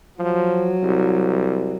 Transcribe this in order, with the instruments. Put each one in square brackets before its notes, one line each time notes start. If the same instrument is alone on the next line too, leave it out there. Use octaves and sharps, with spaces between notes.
[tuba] F3 [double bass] F#3
[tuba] C2